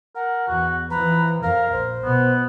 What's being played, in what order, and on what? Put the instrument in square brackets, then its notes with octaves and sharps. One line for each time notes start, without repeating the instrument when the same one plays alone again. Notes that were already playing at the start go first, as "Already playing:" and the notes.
[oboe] A#4 [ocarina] F#5
[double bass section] E2 [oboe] F#4
[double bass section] E3 F3 [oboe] B4 [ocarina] A#5
[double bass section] F2 [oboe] A#4 [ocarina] F5
[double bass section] A#1 [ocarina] C5
[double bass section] B1 B2 [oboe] B3